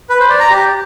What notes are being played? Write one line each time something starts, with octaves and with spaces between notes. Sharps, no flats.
B4
C5
D5
A#5
G4